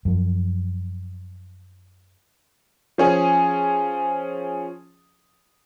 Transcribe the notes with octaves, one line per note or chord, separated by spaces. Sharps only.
F#2 F3
F3 C#4 G#4